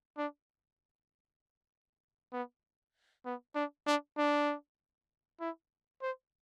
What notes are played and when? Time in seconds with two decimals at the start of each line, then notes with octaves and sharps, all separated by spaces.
0.17 D4
2.33 B3
3.25 B3
3.55 D4
3.86 D4
4.18 D4
5.41 E4
6.02 C5